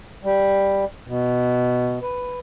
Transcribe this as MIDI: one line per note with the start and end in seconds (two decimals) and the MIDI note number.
0.24 0.85 55
1.08 1.99 47
2.02 2.39 71